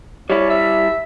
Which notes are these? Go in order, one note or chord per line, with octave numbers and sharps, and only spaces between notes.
G3 E4 C#5
E5